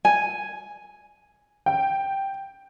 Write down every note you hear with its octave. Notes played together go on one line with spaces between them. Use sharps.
G#5
G5